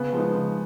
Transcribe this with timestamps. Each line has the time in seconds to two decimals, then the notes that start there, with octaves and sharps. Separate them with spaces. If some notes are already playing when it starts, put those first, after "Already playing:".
Already playing: C#3 B3
0.13 F3 G#3 D#4
0.34 C#3